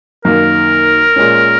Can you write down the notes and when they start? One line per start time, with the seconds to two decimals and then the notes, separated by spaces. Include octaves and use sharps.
0.25 F#2 D#3 A#3 A#4
1.16 A#2 G#3 C#4